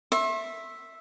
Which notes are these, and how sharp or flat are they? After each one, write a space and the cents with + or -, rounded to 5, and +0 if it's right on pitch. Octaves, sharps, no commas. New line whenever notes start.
E5 +0 C6 +45